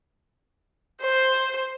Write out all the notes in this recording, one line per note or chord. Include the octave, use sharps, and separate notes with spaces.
C5